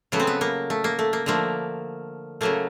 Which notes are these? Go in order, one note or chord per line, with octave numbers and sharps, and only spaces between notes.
C#3 F#3 A3 B3
C4
B3
A#3
A3
A#3
A3
A#3
D3 F3 A3 A#3
C#3 F#3 A3 A#3